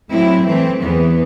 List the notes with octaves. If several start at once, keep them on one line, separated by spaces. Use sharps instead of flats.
A2 F#3 C4 E4
E3 A3 C4
E2 E3 B3